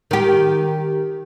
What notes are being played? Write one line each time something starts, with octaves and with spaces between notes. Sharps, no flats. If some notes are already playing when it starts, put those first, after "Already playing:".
D#3 G4